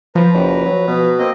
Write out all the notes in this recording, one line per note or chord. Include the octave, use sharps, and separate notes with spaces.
F3 B4 A#5
F#1
F#3
B2
A#3 C4 D#5